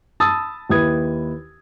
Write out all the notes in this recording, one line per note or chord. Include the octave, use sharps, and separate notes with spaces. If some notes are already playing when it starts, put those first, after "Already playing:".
A5 B5 D#6 E6 A6
D#2 E4 B4 D#6 G#6